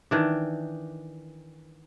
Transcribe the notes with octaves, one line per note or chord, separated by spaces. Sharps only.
D#3 E3 D4